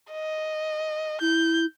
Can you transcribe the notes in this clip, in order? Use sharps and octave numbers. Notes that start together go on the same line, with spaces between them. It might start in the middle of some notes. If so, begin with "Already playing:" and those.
D#5
E4 G6